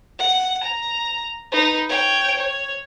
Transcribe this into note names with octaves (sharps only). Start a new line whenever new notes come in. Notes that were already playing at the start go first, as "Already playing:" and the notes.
F#5
A#5
D#4 B4
C#5 G5
C#5